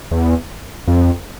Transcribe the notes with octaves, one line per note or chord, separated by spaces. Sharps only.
E2
F2